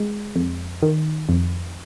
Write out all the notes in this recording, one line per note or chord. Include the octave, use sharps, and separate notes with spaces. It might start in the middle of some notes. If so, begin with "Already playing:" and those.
Already playing: G#3
F2
D#3
F2